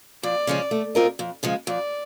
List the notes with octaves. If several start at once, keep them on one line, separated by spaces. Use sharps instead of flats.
F2 D5
C#3 F3 G#3 C#4
A3
C4 F4 A#4 D#5
F2
C#3 F3 G#3
F2 D5